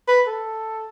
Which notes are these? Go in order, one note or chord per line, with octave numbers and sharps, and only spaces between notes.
B4
A4